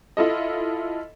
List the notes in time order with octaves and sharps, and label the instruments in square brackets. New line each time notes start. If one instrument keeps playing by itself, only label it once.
[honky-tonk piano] E4 F4 A4 D#5